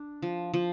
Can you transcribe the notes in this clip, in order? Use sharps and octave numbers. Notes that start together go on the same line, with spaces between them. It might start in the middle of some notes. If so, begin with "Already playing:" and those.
Already playing: D4
F3
F3